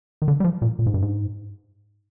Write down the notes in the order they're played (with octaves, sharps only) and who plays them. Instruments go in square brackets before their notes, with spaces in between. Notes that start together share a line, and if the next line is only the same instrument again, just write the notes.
[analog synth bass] D#3
D3
G3
F3
A#2
A#2
G#2
G2
G#2